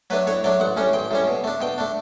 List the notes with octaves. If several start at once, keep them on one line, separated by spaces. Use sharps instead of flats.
F#3 A3 D4 B4
A2 C#5
F#3 A3 D4 D5
A1 F#5
A2 G3 C#4
A1 G5
A2 G3 C#4
B2
A3 D4
B2 G5
A3 D4